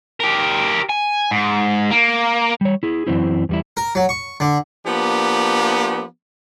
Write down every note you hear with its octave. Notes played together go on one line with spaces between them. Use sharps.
G4 A#4
G#5
G#2
A#3
G3 C#5
E4 G#4
F#2 C#3 E3 C4 E4
E2 G3 E4
A#4
F#3
C#6
D3
F3 A#3 B3 D4 G4